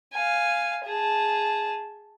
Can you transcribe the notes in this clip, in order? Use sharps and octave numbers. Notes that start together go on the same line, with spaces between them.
F5 G#5
G#4 A5